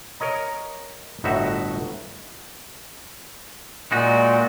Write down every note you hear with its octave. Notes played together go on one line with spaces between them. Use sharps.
A#4 C#5 D#5 A#5
G1 A2 D#4 F#4 E5
A#2 G#3 D#4 F#4